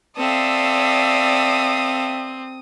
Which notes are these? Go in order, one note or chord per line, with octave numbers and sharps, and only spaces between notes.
C4 A4 D5 E5 F5 D#6